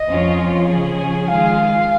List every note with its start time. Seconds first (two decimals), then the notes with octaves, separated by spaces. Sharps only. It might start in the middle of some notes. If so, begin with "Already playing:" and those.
Already playing: D#5
0.09 F2 F3 C#4 F4
0.68 C#3 F3 C#4 G#4
0.98 G#5
1.28 D#3 G#3 F4 G#4 F5